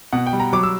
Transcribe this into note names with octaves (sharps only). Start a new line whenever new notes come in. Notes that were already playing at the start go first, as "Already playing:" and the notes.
B2 F#5
G5
G3
A#5
F#3 D6
E6